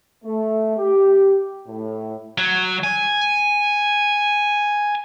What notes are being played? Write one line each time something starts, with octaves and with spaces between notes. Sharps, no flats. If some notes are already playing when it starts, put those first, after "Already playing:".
A3
G4
A2
F#3
G#5